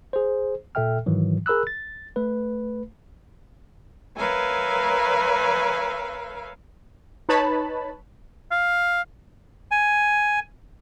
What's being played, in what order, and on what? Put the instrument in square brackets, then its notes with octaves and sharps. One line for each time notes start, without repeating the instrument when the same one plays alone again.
[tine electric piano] G#4 C5
A#2 A4 E5 G5 F6
G#2 D#3 E3 F#3
G#4 A#4 B5 E6 F#6
A6
A3 B4
[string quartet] A#4 B4 C#5 E5 F5 G#5
[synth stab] D#4 B4 C#5 A5 B5
[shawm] F5
[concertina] G#5